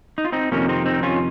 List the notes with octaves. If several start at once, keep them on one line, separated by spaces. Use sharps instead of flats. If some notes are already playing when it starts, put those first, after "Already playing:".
D#4
F4
C4 D#4
F2 C3 D#3 A#3 C#4
C4 D#4
C4 D#4
C#4 F4